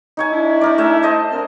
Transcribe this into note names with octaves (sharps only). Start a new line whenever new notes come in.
D#4 C#5 G#5
D4 E4
D#4 A#4 D5
A3 E5 G#5
C5 D#5 A5
C4 D4 A#4